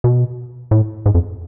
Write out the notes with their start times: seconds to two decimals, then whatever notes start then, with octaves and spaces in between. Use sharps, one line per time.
0.04 B2
0.71 A2
1.06 G#2
1.15 F2